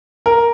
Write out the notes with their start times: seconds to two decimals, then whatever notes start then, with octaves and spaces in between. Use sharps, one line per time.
0.26 A#4